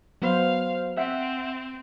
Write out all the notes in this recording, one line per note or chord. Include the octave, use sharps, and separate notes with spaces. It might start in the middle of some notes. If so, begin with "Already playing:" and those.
F#3 B3 C5 F5
C4 E5 F#5